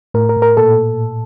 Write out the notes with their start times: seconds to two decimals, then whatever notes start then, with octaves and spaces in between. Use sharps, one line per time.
0.14 A2 A#4
0.29 A#4
0.36 A2
0.42 A#4
0.57 A#2 A4